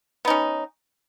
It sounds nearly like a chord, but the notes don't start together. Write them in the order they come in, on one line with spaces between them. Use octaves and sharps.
B3 D#4 C#4